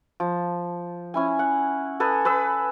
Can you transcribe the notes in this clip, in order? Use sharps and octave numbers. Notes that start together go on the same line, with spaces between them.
F3
C#4 E4 G#5
F#5
A4 B4 G#5 D#6
B4 D#6 E6